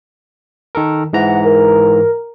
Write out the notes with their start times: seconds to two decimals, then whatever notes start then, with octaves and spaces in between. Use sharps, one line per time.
0.75 D#3 A4 A#4
1.13 G#2 E3 F#5 A#5
1.45 A#4